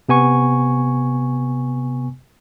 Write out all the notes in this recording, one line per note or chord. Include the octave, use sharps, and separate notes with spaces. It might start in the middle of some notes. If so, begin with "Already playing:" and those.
C3 B3 G#5 C#6